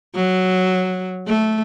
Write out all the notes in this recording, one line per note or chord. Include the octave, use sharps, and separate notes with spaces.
F#3
A3